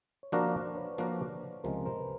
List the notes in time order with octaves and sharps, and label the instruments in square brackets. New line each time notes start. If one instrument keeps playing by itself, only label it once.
[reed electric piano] C#5
[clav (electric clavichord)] F3 A#3 D4 F#4 A#4 [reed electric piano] C5 D5
[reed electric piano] C5 D5
B4 C#5
[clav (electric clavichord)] F3 A#3 D4 F#4 A#4
[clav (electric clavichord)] C#2 C3 F3 G#3 [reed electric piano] A#4 C5
[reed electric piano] A#4 C5
B4